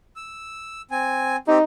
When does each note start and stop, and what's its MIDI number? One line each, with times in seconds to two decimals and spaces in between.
0.16 0.82 88
0.91 1.36 60
0.91 1.36 80
1.48 1.58 60
1.48 1.64 63
1.48 1.58 67